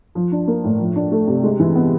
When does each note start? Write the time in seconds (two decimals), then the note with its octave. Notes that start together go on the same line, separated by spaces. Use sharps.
0.15 F3
0.32 D4
0.48 A#3
0.64 A2
0.79 F3
0.96 D4
1.12 A3
1.27 C3
1.43 G#3
1.60 E3
1.75 B3